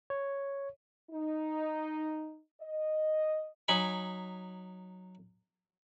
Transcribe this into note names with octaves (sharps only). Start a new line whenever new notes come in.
C#5
D#4
D#5
F#3 D#4 G#5 B5